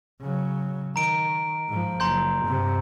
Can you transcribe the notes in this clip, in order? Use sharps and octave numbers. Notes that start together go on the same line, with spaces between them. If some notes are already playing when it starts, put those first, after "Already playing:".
C#3 F#3
D#3 A#5 D7
G#2 F3
F#1 A#5 C6 G6
G2 C3